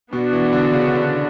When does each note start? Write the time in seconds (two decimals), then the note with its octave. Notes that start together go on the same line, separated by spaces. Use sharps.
0.13 B2 B3 D4 F#4
0.33 E3
0.53 D3
0.73 C#3
0.93 D3